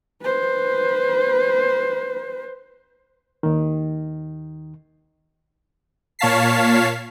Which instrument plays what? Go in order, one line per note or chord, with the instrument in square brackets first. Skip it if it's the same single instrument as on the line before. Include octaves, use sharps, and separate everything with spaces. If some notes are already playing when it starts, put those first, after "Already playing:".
[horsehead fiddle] B4 C5
[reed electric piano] D#2 D#3
[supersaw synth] A#2 C#5 F5 A5 B6 C7